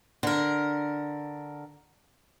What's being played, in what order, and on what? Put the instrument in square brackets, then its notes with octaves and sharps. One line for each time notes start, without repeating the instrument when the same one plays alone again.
[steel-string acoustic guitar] D3 A#4